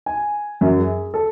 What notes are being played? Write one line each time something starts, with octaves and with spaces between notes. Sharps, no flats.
G#5
F#2
G#4
A4